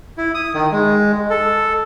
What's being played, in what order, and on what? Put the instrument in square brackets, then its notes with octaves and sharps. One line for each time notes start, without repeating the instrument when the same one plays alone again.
[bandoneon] E4
D#6
D#3
G#3
A4